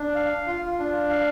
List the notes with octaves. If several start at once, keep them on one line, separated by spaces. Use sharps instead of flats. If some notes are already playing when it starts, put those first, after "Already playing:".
Already playing: D4
F5
F4
D4
F5